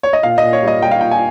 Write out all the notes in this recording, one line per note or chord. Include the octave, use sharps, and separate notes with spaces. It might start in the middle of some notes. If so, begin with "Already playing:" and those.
C#5
D#5
A#2 F5
D#5
A#2
C#5
G3 D#5
G3 G5
F5
A#2 G5
G#5